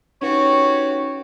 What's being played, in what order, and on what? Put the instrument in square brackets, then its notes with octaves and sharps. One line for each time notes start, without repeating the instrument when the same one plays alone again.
[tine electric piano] C#4 D#4 B4 [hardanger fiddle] F#4 G4 [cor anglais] C#5